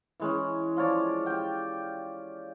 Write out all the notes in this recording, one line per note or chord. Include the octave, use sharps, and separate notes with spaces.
E3 G#3 C#4
F3 F4 C#5 D5
G4 G5